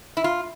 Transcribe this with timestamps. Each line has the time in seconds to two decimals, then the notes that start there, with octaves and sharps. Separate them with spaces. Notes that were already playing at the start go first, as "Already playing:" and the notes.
0.17 E4
0.24 F4